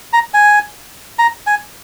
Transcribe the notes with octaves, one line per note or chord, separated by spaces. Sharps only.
A#5
G#5
A#5
G#5